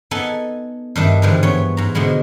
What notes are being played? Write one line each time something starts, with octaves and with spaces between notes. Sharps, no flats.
B3 D#4 A4 F#5 G#5
G2 D#3 D4 E5
G#2 D3 E3 F3 G3
G2 B3 C#5
G#2 A#5
B2 D3 F3 G#3 B3